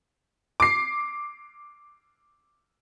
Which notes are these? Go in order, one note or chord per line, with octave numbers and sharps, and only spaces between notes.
D6 C7